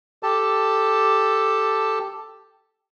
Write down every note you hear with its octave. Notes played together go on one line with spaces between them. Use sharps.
G4 A4 A5